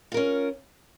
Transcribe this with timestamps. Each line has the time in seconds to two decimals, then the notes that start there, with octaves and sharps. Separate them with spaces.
0.12 F4
0.14 A#4
0.17 C#4